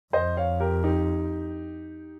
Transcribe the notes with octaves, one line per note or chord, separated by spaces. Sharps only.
F2 C5 D#5
C#5 F5
G4 A#4
D#4 G4